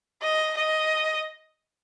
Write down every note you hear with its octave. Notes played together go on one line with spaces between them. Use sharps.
D#5
D#5